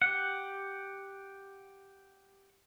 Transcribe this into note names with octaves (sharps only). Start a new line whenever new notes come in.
G4 F#5